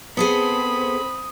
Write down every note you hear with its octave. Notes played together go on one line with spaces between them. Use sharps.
B3 C4 G#4 A4 C5 B5 D#6